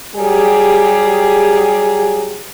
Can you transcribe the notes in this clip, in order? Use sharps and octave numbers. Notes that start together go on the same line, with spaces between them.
F#3 G3 G4 G#4